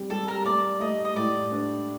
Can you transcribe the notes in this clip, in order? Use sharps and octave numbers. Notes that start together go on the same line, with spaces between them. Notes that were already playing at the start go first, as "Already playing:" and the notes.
Already playing: G3 C4
G3 A4
A#4
A3 D5
A3 D#5
D#5
A2 D5
D4